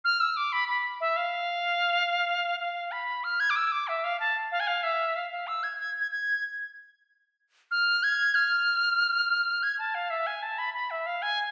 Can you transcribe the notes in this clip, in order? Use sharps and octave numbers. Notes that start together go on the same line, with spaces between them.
F6
E6
D6
B5
B5
E5
F5
F5
B5
F6
G#6
D6
E6
D6
E5
F5
A5
F5
G#5
F5
E5
F5
F5
E6
G#6
G#6
G#6
G#6
F6
G#6
F6
G#6
A5
F5
E5
G#5
A5
B5
B5
E5
F5
G#5